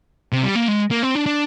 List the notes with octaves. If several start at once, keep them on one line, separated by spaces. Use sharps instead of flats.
C3
G3
A#3
G#3
A#3
C4
D4
D4